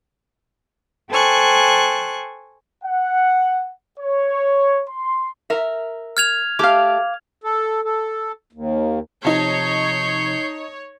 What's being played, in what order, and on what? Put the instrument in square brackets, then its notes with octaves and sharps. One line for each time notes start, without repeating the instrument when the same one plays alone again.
[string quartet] A4 C5 G5 G#5 C#6 F#6
[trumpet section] F#5
C#5
C6
[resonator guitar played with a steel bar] A#4 E5
[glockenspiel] F6 G#6 F7
[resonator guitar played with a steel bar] A3 G4 [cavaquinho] F5 D6
[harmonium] A4
A4
D#2
[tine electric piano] C3 F3 [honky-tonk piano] D#4 A5 [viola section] C#5 [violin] G6 C7